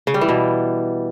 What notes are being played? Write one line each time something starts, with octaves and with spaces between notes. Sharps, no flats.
C#3
G3
E3
B2